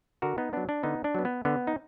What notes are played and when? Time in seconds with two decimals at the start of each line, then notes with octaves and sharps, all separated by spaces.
0.22 D3 F#4 A#4
0.38 B3 D#4
0.53 F#3 B3 D4
0.69 D4
0.83 D3 B3 D#4
1.04 D4
1.15 F#3 B3
1.25 B3
1.45 D3 B3
1.67 D#4